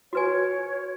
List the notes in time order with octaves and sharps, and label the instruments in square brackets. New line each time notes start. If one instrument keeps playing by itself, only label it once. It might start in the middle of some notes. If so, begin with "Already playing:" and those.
[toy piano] F#4 B4 G#5 [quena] C#5